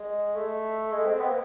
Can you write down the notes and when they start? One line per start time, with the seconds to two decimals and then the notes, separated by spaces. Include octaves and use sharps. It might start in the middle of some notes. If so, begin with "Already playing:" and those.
Already playing: G#3
0.35 A3
0.92 G#3
1.06 C4
1.20 B3
1.28 A#3